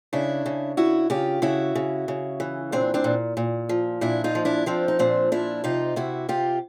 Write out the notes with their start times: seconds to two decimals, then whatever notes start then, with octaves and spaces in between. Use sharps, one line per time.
0.13 C#3 D4 E4
0.46 C#3
0.77 C#3 E4 F#4
1.10 C#3 F4 G4
1.42 C#3 E4 F#4
1.75 C#3
2.08 C#3
2.40 E3
2.72 A#2 C4 D4
2.94 C4 D4
3.04 A#2
3.37 A#2
3.69 F3
4.01 A#2 D4 E4
4.24 D#4 F4
4.35 F3
4.45 D4 E4
4.66 F3 C4 D4
4.88 D#4
4.99 A#2 C4 D4
5.32 F3 D4 E4
5.64 C3 D#4 F4
5.96 C3 E4 F#4
6.29 C3 F4 G4